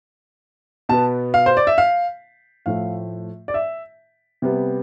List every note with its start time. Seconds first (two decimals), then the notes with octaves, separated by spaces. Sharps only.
0.89 B2 B3 A5
1.34 F5
1.46 C5
1.57 D5
1.67 E5
1.78 F5
2.66 A2 F3 A3 F5
3.48 D5
3.54 E5
4.42 C3 G3 B3